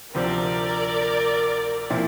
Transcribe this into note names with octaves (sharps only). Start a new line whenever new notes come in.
D2 C3 F3 C4 A#4 D5
A#2 F3 C4 E4